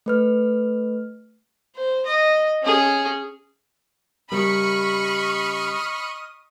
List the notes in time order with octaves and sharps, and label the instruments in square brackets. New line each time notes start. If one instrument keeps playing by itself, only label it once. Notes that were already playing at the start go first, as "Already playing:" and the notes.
[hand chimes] A3 B4 F6
[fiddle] C5
D#5
C#4 G#4
[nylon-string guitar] C#3 G3 A#4 [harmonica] D#5 D#6 F6 [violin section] B5 C#6